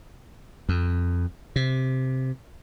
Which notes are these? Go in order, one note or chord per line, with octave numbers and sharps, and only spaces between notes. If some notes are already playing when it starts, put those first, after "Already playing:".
F2
C3